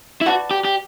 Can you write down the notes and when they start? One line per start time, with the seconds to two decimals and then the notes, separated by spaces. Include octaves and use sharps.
0.21 E4
0.26 F#4 B4 D5 F#5 A5
0.51 G4
0.65 G4